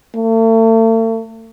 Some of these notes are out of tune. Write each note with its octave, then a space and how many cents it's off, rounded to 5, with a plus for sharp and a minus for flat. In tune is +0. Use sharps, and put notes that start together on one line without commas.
A3 +40